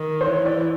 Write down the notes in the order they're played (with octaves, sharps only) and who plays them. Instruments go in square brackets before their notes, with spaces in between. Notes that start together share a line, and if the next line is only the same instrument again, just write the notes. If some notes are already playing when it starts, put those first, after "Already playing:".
Already playing: [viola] D#3
[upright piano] C5
[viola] E3 [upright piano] C#5
[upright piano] D5